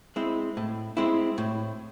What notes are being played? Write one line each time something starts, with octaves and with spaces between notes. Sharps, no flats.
G#3 C4 E4
A2
G#3 C4 E4
A2